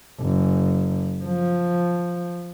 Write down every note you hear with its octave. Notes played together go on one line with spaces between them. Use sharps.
F#1
F3